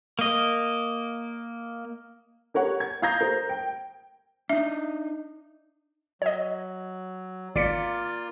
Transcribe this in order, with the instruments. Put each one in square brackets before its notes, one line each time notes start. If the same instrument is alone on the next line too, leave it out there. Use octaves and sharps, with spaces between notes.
[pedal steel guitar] A#3 D#5
[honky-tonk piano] G4 A#4 C#5 F#5
G#6
F5 A#5 D#6 G6 G#6 A#6
A#4 C5
G5
[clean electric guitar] D4 D#4 [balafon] E5
[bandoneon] F#3 [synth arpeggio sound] C#5 D#5
[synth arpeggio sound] G#1 B6 C#7 [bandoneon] A#3 F4 [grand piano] D5